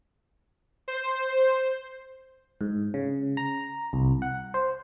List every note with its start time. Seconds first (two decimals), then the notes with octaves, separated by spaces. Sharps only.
0.88 C5
2.61 G#2
2.94 C#3
3.37 A#5
3.93 C2
4.22 F#5
4.54 C5